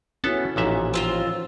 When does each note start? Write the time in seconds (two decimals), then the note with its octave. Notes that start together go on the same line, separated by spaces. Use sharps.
0.24 B3 C#4 E4 F#4 A4 A5
0.56 A1 A#2 F3 D#4 E5
0.94 C4 F4 C5